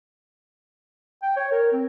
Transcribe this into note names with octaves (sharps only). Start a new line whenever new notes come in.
G5
C#5
A#4
C4